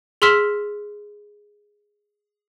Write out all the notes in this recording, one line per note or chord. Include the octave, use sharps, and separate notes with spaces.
G#4 C6 E6 F6 B6 E7